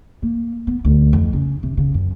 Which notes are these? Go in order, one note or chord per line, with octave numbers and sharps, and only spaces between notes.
A#3
B3
D2
F2
C#3
C3
C#3
F#2